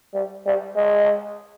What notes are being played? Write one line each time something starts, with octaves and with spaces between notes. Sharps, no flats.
G3
G3
G#3